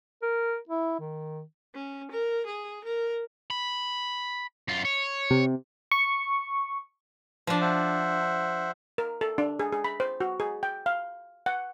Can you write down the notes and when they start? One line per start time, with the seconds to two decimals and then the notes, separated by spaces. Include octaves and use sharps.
0.22 A#4
0.69 E4
1.00 D#3
1.74 C#4
2.11 A#4
2.46 G#4
2.84 A#4
3.50 B5
4.68 F#2 F4
4.85 C#5
5.30 C3
5.91 C#6
7.47 F3 D4
7.61 C5 E5 F#5
8.98 A#4
9.21 A4
9.38 D4
9.60 G#4
9.72 G#4
9.84 B5
10.00 C5
10.20 F#4
10.40 G#4
10.63 G5
10.86 F5
11.46 F#5